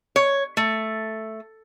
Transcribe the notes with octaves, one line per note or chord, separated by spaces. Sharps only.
C#5
A3